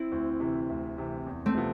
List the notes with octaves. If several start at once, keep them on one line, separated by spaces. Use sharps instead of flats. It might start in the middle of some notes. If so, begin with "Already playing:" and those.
Already playing: C4 E4
D2
C3 E3
D2
C3 E3
E2
A3 C4
C3 F3 B3